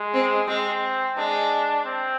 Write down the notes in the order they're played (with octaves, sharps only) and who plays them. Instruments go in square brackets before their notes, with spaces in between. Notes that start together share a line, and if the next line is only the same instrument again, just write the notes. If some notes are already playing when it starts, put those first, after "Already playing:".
Already playing: [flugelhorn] G#3
[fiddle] C4
[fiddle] G#3 [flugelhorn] C4
[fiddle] G#3 [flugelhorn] D4
[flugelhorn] C4